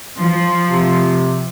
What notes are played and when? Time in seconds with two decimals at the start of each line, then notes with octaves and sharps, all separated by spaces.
0.17 F3
0.69 C3